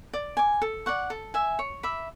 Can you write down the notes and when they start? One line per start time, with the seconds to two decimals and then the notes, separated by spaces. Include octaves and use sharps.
0.13 D5
0.37 G#5 D6
0.62 A4
0.86 D5 F#5 C#6
1.10 A4
1.34 E5 G#5
1.59 C#5
1.83 E5 B5 D6